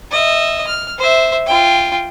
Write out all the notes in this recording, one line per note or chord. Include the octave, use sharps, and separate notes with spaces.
D#5 E5
F6
C5 E5
F4 G5